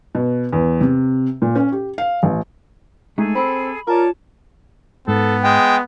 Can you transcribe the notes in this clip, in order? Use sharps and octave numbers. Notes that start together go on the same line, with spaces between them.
B2
E2
C3
A#2
C#4
G4
F5
A1
G#3 A3 D#4 G#4 A4
C4 B5
F4 A#4 C#5 D5 A5
G#2 B3 A4
G#3 G5